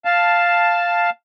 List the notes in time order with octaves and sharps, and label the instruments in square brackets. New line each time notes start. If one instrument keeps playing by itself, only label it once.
[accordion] F5 A5